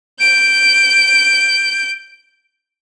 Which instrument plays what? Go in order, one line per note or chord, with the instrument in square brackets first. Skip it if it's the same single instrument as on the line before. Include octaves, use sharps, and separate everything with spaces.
[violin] G6 D7